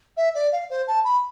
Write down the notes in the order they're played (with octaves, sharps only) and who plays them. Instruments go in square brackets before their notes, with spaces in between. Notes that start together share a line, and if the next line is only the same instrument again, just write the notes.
[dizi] E5
D5
F5
C5
A5
B5